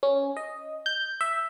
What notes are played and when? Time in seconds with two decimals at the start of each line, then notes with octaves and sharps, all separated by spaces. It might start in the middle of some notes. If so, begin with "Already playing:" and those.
0.03 C#4
0.37 D#5
0.86 G6
1.21 E5